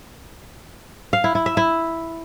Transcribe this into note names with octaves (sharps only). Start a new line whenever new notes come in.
F5
E4
E4
E5
E4